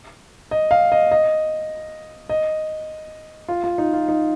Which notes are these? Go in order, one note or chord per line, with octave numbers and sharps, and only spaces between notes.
D#5
F5
D#5
D#5
D#5
F4
F4
D#4
F4
D#4